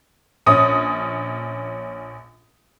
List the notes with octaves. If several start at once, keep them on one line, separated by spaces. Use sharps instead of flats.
A#1 C#4 D#6